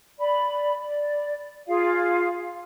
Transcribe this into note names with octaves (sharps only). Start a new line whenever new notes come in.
D5 B5
D5
F4 G#4 F5